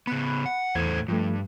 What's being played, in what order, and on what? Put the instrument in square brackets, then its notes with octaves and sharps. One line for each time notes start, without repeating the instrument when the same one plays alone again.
[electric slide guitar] C#3 B3 [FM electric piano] B5 F#6
[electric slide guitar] F#5
[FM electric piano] E2 E3 G#6 [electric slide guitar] A2 A4 C5
[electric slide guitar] G2 [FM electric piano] F3 A3